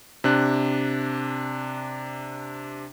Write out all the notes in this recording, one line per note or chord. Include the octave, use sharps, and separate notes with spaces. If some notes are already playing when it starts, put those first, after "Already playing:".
C3 D4 F#6